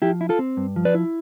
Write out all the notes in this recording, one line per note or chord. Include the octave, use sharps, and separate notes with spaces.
F3 E4 G4
E4
F4 A4
C4
G2
F3
B4 D5
E4